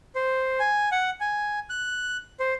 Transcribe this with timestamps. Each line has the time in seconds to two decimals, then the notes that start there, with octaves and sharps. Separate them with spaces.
0.15 C5
0.60 G#5
0.92 F#5
1.20 G#5
1.70 F#6
2.40 C5